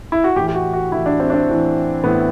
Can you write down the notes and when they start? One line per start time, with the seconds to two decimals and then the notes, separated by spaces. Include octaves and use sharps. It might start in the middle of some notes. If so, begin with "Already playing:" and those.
0.12 E4
0.24 F#4
0.36 A2 G4
0.39 E3
0.47 G4
0.55 F#4
0.73 F#4
0.92 A2 E3 E4
1.06 D4
1.20 C4
1.30 D4
1.34 C4
1.48 A2 E3
2.04 A2 E3 B3